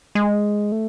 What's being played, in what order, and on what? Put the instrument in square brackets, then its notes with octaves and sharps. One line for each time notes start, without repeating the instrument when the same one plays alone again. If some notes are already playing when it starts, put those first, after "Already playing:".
[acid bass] G#3
A3